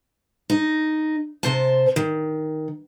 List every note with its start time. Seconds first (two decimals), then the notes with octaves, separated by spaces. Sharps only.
0.50 D#4
1.43 C3 C5 A5
1.96 D#3